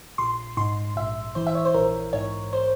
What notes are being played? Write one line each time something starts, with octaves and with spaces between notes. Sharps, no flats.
A#1 C6
G#2 C6
A#1 E5
E3 C5
E5
C#5
C5
A#1 A#4
G#2 C#5
C5